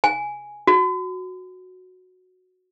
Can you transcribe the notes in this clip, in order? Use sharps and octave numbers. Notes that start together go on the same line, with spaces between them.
G#5
F#4